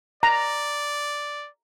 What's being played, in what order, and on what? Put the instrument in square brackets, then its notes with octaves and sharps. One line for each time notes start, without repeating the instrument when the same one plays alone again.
[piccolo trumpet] D5 [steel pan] A#5